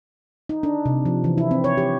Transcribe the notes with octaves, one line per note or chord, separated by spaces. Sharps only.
D#4
D4
C3
F3
E3
E4
C4
C#5
G4